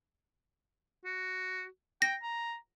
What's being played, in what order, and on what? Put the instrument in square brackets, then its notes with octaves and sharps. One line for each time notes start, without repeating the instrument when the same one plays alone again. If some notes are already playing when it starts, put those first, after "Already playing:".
[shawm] F#4
[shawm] G5 [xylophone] A#6
[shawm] A#5